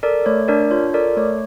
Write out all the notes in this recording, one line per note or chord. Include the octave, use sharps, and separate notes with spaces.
A4 A#4 D5
A3 C#5
D4 A#4 D5
F4 C#5
A4 A#4 D5
A3 C#5